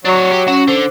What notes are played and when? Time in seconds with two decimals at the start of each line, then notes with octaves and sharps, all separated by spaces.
0.05 F#3 D4 C#5
0.31 G4
0.48 C#4 F#4
0.68 D3 C5